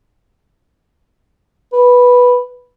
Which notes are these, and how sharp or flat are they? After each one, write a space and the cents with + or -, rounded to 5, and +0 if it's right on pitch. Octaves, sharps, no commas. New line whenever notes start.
B4 -5